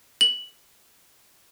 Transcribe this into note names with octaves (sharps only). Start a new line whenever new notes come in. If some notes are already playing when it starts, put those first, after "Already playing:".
F#7